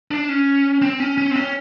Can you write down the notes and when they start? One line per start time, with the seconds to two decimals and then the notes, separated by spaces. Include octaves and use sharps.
0.11 D4
0.29 C#4
0.82 C4
1.00 C#4
1.18 C#4
1.31 C4
1.36 C#4